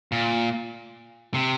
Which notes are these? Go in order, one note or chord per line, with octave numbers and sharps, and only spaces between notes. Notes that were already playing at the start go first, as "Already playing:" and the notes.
A#2
C3